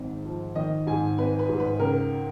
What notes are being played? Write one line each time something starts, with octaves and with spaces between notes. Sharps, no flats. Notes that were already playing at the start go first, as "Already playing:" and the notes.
Already playing: G#1 G#2
F3
D#3 D#5
G#2 G#5
G#1 B4
B4
G#2
B4
C#2 A#4